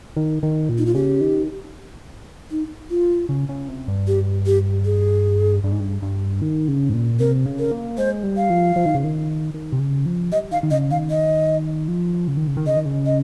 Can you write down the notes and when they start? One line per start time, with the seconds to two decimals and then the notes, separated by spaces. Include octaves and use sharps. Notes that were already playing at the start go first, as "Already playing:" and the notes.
0.16 D#3
0.43 D#3
0.69 A#2
0.78 D#4
0.86 F4
0.95 C#3 G4
1.21 D#3
2.51 D#4
2.90 F4
3.29 C#3
3.49 C#3
3.68 C3
3.88 G2
4.08 G4
4.46 G4
4.85 G#4
5.63 G2
5.72 G#2
5.80 G2
6.02 G2
6.42 D#3
6.68 C#3
6.89 G#2
6.94 A#2
7.19 C3 A#4
7.46 C#3
7.59 A#4
7.72 A#3
7.98 G#3 C5
8.23 G3
8.37 F5
8.50 F3
8.76 F3
8.86 D#3
8.95 C#3
9.04 D#3
9.54 D#3
9.72 C3
9.79 C#3
10.06 F3
10.32 G3 D#5
10.51 D#3 F5
10.63 D#3
10.71 C#3 D#5
10.91 D#3 F5
11.10 D#5
11.88 F3
12.28 C#3
12.37 D#3
12.47 C#3
12.57 D#3
12.67 C#3 D#5
12.76 D#3
12.86 C#3
13.06 D#5